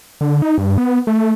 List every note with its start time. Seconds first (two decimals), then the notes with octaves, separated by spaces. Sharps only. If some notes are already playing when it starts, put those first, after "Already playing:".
0.21 D3
0.42 D#4
0.58 G2
0.78 B3
1.07 A3